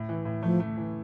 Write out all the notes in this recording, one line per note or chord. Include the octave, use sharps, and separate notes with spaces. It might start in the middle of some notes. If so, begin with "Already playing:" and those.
Already playing: A2
E3
A2
F3 A3
A3
E3